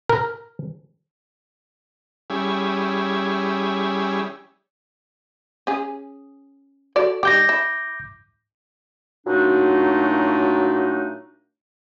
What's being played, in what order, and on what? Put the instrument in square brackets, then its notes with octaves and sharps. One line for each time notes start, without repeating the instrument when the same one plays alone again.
[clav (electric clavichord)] A#4
[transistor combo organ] G3 C#4 E4 G#4
[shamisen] C#4 G#4
F#4 A4 D5
[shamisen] D#3 G3 G4 [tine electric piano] D6 G6 A#6
[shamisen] E4
[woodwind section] A#2 F#3 A3 D4 D#4 F#4